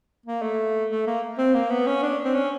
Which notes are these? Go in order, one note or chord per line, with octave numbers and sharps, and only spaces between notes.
A#3
A3
A3
A#3
C4
A#3
B3
C#4
D4
C4
C#4